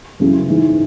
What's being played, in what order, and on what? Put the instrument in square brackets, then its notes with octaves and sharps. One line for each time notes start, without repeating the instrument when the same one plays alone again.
[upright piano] F#2 C#3 E3
G#2 E3